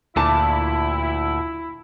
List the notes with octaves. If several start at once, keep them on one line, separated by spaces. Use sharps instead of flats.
D2 A#2 E4 A5